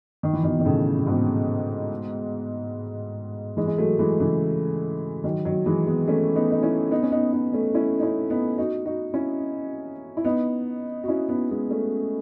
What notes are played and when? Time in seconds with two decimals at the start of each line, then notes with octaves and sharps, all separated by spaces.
0.23 D#3
0.33 E3
0.43 B2 D#3
0.59 D#3
0.65 A2 C#3
0.99 C#3
1.07 G#2 B2
3.57 E3 G#3
3.67 G#3
3.78 F#3 A3
3.99 E3 G#3
4.20 C#3 E3
5.24 D#3 F#3
5.45 D#3 F#3
5.66 E3 G#3
5.86 G#3 B3
6.08 A3 C#4
6.36 B3 D#4
6.51 D#4
6.63 C#4 E4
6.91 B3 D#4
7.03 C#4
7.12 B3 D#4
7.33 B3 D#4
7.53 A3 C#4
7.74 C#4 E4
7.99 D#4
8.02 C#4 E4
8.30 B3 D#4
8.58 D#4 F#4
8.86 D#4 F#4
9.14 C#4 E4
10.17 E4
10.24 B3 D#4
11.04 F#4
11.08 C#4 E4
11.29 B3 D#4
11.51 G#3 B3
11.71 A3 C#4